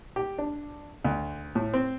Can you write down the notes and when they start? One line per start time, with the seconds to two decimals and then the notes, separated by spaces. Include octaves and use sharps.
0.16 G4
0.38 D4
1.05 D2
1.55 A2
1.73 C4